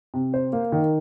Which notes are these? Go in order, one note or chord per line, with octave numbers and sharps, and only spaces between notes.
C3
C5
A#3
D#3